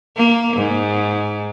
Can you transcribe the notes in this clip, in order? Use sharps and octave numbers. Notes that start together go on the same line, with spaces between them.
A#3
G#2